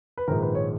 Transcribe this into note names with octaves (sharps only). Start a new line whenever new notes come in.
B4
A#1 G#2 D#3 A#4
B4
C#5